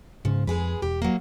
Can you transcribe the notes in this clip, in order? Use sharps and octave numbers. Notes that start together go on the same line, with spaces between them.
G#2 C#3 F3
F2 G#3 G#4 B4
E1 G4
F#3 A#3